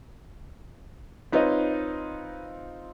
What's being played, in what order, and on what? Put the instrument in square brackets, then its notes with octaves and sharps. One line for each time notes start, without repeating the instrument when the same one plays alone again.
[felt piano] C4 D#4 F4 [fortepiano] B4 C#5 D#5